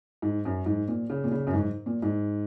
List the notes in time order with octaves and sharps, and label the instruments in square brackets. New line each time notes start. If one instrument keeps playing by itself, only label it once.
[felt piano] G#2
F#2
G#2
A#2
C#3
A#2
C#3
F#2
G#2
A#2
G#2